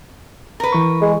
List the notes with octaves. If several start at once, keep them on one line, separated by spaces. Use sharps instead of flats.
A#4 B4
E3 C#6
G#3